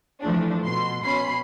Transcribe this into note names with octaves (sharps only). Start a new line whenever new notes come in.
E3 F3 A3 D4
B2 C6
B2 C#4 B5 C6 C7